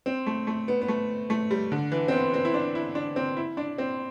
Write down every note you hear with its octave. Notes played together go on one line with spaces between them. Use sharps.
C4
A3
A3
B3
B3
A3
A3
G3
D3
E3
C4
B3
C4
E4
D4
E4
D4
C4
E4
D4
C4